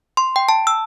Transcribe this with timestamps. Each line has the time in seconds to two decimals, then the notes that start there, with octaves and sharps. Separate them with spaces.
0.17 C6
0.36 G5
0.49 A5
0.67 E6